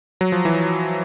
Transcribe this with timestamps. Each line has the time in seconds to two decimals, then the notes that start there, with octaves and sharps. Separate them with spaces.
0.21 F#3
0.32 F3
0.45 E3